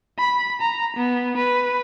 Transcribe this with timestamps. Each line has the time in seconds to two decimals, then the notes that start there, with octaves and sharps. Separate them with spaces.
0.19 B5
0.61 A#5
0.97 B3
1.37 B4